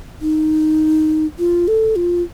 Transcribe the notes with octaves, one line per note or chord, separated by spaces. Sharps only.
D#4
F4
A4
F4